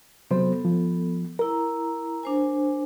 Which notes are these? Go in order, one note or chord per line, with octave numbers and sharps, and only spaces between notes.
C3 F#3 B3 A4 C5
F3
E4 A#4 A#5
D4 C5 G#5